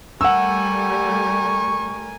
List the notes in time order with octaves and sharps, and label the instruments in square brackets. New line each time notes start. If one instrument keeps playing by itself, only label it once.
[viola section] G3 A3 [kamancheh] A#4 G#5 [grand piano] F#5 E6 [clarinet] C#6